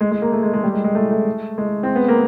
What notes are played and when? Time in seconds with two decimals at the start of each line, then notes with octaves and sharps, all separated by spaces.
0.01 G#3
0.11 G#3
0.22 A#3
0.32 A3
0.43 G#3
0.53 G#3
0.63 G3
0.74 G#3
0.84 G#3
0.95 A3
1.11 A3
1.58 G#3
1.83 C4
1.96 B3
2.08 A#3